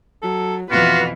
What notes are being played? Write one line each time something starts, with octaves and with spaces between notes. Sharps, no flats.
F#3 A4
F2 B2 E3 F4 F#4 B4 F5